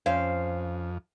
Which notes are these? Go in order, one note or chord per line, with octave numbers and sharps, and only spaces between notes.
F2 C4 C#4 F5